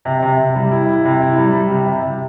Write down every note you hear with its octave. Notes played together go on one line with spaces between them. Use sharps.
C3
C3
C3
G3
E4
E4
C3
E4
G3
G3
C3
C3
C3